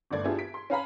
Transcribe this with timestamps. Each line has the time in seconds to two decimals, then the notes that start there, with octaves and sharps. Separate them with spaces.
0.11 G1 D3 A3 D5 G#6
0.24 B3 D4 E4 F4 G4 G#4
0.39 B6 D7
0.54 C6
0.70 C#4 B4 F5 G#5 A#5 B5